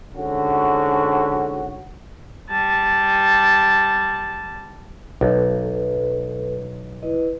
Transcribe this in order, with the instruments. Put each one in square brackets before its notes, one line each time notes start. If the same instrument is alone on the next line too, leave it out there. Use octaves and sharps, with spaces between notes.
[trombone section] G#2 D3 C#4 F#4
[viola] G3 A5
[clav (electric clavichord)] B1 [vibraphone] A4 B4
[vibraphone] E4 B4 D#5